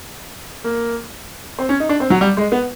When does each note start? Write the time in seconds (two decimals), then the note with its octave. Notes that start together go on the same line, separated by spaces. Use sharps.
0.64 A#3
1.59 C4
1.69 C#4
1.80 D#4
1.89 D4
2.00 C4
2.10 F#3
2.21 G3
2.37 G#3
2.52 B3